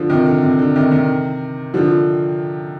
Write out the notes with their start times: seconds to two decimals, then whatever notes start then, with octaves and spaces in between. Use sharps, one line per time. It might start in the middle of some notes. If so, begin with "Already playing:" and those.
Already playing: D3 F3
0.10 C3 D#3
0.26 D3
0.42 C3
0.59 D3
0.76 C3 D#3
0.91 C3 D#3
1.74 D3 F3